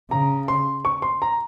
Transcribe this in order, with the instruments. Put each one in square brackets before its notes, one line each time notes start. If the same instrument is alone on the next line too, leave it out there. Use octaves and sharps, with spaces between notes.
[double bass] C#3 [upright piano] A#5
[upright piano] C6
C#6
C6
A#5